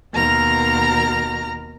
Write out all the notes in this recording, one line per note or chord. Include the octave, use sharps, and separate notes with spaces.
D#2 B2 A#4 A#5 F6